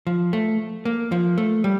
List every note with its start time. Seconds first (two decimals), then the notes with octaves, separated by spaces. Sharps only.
0.07 F3
0.33 A3
0.85 A#3
1.12 F3
1.38 A3
1.64 G3